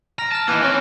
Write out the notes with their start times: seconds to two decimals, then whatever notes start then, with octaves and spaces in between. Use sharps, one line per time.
0.19 A#5 F6 A#6 D7
0.32 A5 F6 A#6 D#7
0.48 E3 A#3 D#4 D6 B6
0.63 C4 C#4